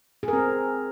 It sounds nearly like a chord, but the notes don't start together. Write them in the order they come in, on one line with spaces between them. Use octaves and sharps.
G#4 A#4 C4